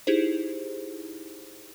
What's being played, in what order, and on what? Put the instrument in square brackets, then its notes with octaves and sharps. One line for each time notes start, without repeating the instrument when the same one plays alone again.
[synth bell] D#4 E4 G4 G#4 C5